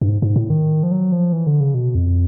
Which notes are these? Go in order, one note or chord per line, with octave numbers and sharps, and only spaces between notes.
G2
G#2
G#2
A2
D#3
F3
F#3
F3
E3
D3
C#3
B2
F2